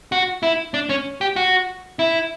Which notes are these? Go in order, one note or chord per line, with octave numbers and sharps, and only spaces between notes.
F#4
E4
D4
C#4
G4
F#4
E4